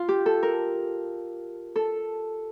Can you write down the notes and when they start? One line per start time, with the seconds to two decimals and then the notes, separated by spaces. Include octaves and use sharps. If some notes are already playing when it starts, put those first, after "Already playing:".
Already playing: F4
0.09 G4
0.26 A4
0.43 A#4
1.76 A4